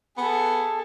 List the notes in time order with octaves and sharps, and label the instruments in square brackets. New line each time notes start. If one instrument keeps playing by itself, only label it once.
[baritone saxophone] B3 [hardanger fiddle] G#4 A4